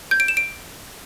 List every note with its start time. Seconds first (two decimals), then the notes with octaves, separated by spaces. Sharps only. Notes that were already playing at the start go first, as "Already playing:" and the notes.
0.11 G6
0.20 D7
0.28 E7
0.37 D7